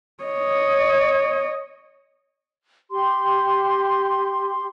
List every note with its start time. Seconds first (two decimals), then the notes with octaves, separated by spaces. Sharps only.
0.24 C#5 D#5
2.91 G4 C6